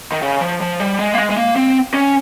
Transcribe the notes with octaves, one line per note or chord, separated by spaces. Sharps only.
D#3
C#3
F3
F3
G3
G#3
A#3
G#3
G#3
A#3
C4
C#4